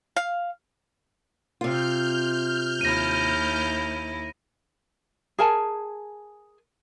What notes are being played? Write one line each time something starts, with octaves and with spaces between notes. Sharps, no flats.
F5
C3 F4 F6 G6
D#2 E4 A#6 D#7
G#4 A#4 G#5 A5